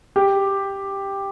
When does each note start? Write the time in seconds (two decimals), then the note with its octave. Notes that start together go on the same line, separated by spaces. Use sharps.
0.16 G4